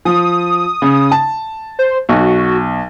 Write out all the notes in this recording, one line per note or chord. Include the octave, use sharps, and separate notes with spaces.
F3 D#6
C#3
A5
C5
B1 F#4